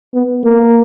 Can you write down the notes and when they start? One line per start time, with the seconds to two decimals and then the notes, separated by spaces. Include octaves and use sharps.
0.14 B3
0.44 A#3